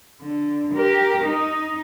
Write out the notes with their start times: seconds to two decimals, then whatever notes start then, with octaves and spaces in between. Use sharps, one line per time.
0.21 D3
0.75 G4 A#4
1.25 D#4